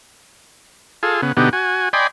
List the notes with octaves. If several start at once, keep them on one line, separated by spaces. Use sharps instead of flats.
F4 G#4 A4
C#3 B3
B2 D3 B3 D#4 G4
F#4 G#5
D5 D#5 G5 G#5 B5 C6